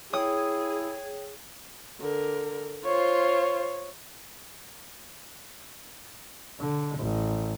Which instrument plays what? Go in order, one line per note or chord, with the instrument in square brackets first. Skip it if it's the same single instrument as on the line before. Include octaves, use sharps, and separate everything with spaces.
[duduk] E4 [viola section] G#4 [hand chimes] C#5 G5 [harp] D#6
[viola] D3 A#4
[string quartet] F4 C5 [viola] C#5
[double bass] D3
A1